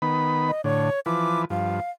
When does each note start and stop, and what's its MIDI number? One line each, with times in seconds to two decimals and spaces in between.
0.02 0.51 51
0.02 0.51 59
0.02 0.51 83
0.48 0.61 75
0.64 0.90 45
0.64 0.90 50
0.64 1.00 73
1.06 1.45 52
1.06 1.45 53
1.06 1.45 71
1.06 1.42 86
1.50 1.80 43
1.50 1.80 53
1.50 1.90 77